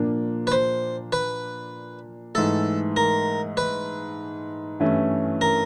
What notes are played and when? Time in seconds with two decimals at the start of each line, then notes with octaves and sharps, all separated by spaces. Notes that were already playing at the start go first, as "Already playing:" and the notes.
Already playing: A#2 F3 A#3 D4
0.47 B4
0.52 C5
1.12 B4
2.35 G#2 E3 A3 A4
2.97 A#4
3.57 B4
4.80 G2 E3 A3 C#4 E4
5.41 A#4